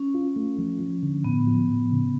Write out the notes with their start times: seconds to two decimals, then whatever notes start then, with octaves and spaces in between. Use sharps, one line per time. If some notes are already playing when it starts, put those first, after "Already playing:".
Already playing: C#4
0.14 F4
0.36 A3
0.58 F3
0.80 F3
1.03 D3
1.24 A2 B3
1.47 F3
1.69 A2
1.91 C#3